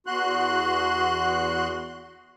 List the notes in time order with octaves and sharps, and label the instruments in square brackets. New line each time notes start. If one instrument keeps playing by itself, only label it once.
[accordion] E2 F#4 C6 F#6